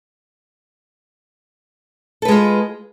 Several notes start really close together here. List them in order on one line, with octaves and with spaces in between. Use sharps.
A4 B4 G#3 F4